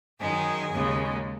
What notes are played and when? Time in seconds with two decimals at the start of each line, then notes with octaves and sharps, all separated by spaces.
0.20 F#2 D#3 G#3 G#4
0.72 D#2 C#3 G#3